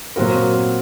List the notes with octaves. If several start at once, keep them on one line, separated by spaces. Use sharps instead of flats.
A#2 F#3 C4 F#4 A#4